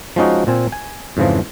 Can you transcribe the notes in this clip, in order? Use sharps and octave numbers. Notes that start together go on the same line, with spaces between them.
F3 G#3 C#4 D#4 F#4
A#2 C4 G#5
G#5
F2 G#2 C#3 E3 F3